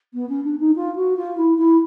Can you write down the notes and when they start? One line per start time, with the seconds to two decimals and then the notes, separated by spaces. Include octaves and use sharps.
0.14 B3
0.29 C#4
0.44 D4
0.60 D#4
0.76 F4
0.96 F#4
1.17 F4
1.37 E4
1.58 E4